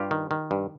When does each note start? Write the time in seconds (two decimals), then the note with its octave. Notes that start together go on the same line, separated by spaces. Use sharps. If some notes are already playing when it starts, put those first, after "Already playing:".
Already playing: G2 F4 G4
0.11 D#3
0.31 D#3
0.51 G2